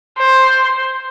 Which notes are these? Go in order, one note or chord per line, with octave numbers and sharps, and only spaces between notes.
C5